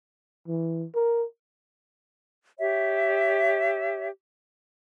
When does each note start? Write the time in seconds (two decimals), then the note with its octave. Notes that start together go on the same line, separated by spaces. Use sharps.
0.48 E3
0.95 A#4
2.59 G4 C#5 E5